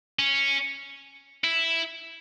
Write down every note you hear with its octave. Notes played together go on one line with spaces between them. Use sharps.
C#4
E4